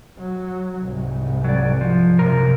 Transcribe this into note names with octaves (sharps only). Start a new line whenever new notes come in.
F#3
C2 G#2
F#3 D5
F3
F#2 C3 A#4